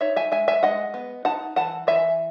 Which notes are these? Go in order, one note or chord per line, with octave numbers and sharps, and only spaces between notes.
D#4 C#5 E5
E5 G#5
G#3 E5 G#5
E5 G#5
G#3 D#5 F#5
B3
D#4 F#5 A5
E3 F#5 A5
E3 E5 G#5